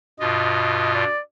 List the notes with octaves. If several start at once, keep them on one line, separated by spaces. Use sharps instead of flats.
G2 B2 F4 D#5
D5